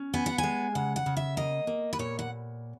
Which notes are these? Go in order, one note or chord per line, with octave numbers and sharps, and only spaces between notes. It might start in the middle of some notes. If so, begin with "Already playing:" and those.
Already playing: C#4
B3 G#5
F#5
G#5
G#3
C#3 F#5
F#5
C#3
E5
A#3 D#5
A#3
B4
A#2 C#5
F#5